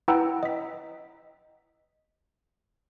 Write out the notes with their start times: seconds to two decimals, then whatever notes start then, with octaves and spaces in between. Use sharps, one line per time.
0.08 E4 B4 F#5 G5 A#5 E6
0.43 D#5 B6